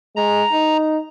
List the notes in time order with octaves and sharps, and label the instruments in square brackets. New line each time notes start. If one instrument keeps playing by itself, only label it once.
[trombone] G#3 [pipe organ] A#5
[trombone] D#4